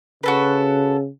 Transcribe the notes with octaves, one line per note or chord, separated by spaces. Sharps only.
C#3 F#4 A4 B4